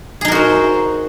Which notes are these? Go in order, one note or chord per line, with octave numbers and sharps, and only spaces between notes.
D#4 F#4 G#4 A#4 C5